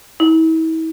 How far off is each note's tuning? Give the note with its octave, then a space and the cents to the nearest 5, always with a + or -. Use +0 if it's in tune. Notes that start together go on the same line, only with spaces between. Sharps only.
E4 -40